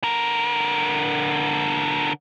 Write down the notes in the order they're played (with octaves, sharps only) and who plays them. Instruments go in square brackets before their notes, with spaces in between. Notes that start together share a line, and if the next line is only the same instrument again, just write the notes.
[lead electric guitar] D3 A#4